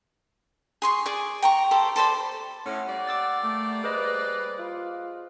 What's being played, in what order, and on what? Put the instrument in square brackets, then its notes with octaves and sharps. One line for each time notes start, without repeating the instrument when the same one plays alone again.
[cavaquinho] G#4 C6 C#6
G#4 D5
G5 A#5 C#6
G4 A4 C5
A4 C5 D5 B5
[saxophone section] A2 C#4 [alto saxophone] F#5
[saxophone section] G3 A#3 D5
[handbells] D6 E6 A6
[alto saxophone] A3
[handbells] G#4 C5 D#5 [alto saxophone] B4
[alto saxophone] F4